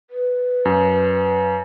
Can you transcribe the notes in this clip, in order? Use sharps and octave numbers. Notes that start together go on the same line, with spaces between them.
B4
F#2